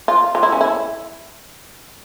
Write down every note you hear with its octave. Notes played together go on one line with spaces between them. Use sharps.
F4
F4
E4
C#4
E4